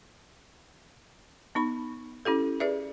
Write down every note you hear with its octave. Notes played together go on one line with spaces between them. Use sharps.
B3 D#4 B5
C#4 E4 G4 A4
G#4 B4 D5 E5